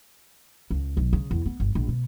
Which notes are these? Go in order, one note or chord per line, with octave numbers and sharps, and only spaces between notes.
C#2
B1
C#3
E2
B3
G1
A#1
B2